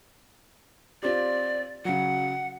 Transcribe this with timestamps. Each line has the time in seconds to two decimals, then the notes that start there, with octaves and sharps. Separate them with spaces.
1.03 C4 F4 G4 D5
1.85 C#3 F#3 F#5